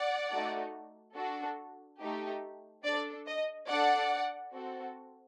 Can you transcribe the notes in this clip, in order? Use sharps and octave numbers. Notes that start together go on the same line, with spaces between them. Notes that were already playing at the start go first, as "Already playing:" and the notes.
Already playing: D5 F#5
A3 D#4 F#4 A4
D4 F#4 A4
A3 D#4 G4
D4 A4 D5
D#5
D4 A4 D5 F#5
C4 F#4 A4